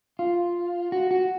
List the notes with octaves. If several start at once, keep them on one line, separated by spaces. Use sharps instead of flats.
F4
F#4
F#4